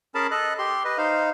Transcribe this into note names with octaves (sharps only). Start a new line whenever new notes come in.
C#4 G#4 A#4 A5 B5
A4 D#5 F#6
G4 C6
B4 D#5
D#4 C5 F5